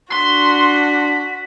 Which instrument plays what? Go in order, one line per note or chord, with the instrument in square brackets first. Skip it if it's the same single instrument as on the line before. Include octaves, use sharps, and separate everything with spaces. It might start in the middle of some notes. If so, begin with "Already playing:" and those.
[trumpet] D4 [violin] F#4 [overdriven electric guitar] C6 [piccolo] B6